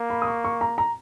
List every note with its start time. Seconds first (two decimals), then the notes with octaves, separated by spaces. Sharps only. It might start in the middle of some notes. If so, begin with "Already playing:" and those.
Already playing: A#3
0.10 B5
0.22 D#6
0.27 C#6
0.44 C#6
0.61 A#5
0.78 A#5